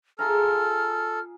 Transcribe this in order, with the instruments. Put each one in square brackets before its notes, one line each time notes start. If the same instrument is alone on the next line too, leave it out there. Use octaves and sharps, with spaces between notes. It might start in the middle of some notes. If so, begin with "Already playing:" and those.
[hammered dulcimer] F4 G#4 A#5 [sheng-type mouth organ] A4 [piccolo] F6